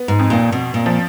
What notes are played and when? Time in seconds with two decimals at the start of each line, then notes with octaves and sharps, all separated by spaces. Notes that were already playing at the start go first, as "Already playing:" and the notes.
Already playing: B3
0.08 G#2
0.19 F2
0.30 A#2
0.52 F2 B2
0.74 A#2
0.86 F3